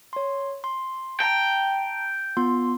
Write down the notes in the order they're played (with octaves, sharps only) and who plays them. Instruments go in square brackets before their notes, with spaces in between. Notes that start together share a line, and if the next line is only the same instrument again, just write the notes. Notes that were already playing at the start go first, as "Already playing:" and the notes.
[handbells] C#5 C6
C6
[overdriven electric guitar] G5 [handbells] A5 A#5
[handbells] B3 F4 C6